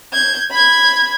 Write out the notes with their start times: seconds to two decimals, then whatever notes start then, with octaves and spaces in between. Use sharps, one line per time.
0.13 G6 G#6
0.51 B5 G#6